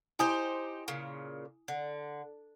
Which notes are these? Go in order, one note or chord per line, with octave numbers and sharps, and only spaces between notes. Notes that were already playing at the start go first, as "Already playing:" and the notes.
D#4 E4 G4 C5 G#5 D#6
A#2 C#3
D3